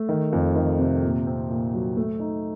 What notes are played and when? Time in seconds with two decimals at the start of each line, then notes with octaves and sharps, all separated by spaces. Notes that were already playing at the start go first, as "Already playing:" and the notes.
Already playing: A3
0.09 D#3
0.33 F2
0.55 D#3
0.79 C3
1.03 A#2
1.27 C4
1.50 A#2
1.74 F#3
1.97 A3
2.20 D#4